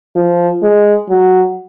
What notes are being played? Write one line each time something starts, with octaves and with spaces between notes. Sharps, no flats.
F3
G#3
F#3